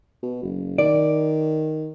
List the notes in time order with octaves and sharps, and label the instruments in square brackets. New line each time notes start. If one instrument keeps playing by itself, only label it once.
[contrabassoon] B2
F#1
[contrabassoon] D#3 [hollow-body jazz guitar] D5